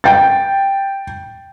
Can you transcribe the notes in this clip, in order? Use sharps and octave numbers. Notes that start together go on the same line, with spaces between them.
G5 A6